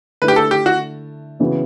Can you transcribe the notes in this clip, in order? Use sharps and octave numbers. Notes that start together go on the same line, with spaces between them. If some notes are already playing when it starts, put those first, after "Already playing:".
D3 A3 E4 B4
G4
A4
G4
F#4
C#3 E3 B3 F#4